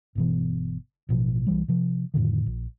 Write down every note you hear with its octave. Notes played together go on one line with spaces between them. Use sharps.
G1 B2 E3
A1 B2 F3
B1 E3 G3
C3 F3
F2 A2 D3 D#3
A#1